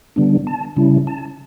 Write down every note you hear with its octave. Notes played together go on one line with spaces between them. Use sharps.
D3 G3 B3 D4
A5
C#3 G3 C#4 E4
A5